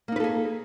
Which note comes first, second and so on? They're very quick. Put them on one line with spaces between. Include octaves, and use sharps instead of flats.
A#3 D#4 B4 A4 G#4